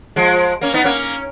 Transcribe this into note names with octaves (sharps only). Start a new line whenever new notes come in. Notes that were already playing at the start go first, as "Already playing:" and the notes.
F3 G#3
A#3 C#4
B3 D#4
A#3 C#4